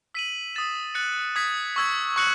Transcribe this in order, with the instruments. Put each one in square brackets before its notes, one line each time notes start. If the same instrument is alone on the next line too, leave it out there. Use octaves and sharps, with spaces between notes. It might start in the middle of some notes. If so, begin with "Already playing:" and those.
[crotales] E6 B6 D#7 F#7
D#6 A6 E7
F#6 A6 C#7 F#7
D#6 G#6 B6
C#6 E6 G#6
C#6 F#6 C#7 F#7